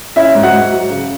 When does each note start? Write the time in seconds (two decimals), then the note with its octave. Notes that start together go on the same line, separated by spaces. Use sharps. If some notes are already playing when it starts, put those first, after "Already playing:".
0.16 C#4 E4 E5
0.35 G#2
0.43 F#4 F#5
0.53 G#2
0.72 F#3
0.90 C#3